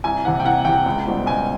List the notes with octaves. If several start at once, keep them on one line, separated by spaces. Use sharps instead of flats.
C2 G#5
C3 E3 F#5
G5
C2 F#5
C3 E3 G5
C#2
B2 G3 C4
C#2 G#5